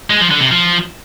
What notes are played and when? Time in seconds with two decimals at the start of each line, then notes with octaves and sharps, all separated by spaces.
0.10 G#3
0.20 F3
0.31 D3
0.41 C3
0.51 F3